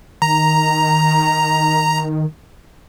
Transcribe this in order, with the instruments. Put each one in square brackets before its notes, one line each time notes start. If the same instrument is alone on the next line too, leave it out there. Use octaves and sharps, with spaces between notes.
[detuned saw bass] D#3 [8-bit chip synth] A#5